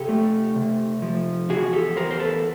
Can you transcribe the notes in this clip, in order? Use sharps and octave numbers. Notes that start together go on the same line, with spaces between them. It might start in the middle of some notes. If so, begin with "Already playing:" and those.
Already playing: C3 G4 A4
A3
C3
F3
E2 F#4 G#4
G4 A4
E2 A#4 C5
C5
A4 B4